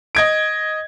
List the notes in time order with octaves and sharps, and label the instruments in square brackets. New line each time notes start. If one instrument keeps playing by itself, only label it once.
[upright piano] D#5 G#6 D7